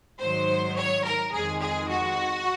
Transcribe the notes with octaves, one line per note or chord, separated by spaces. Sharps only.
G#2 D#3 F#3 C5
C#5
A#4
F2 D#3 G#3 G#4
G#4
F#4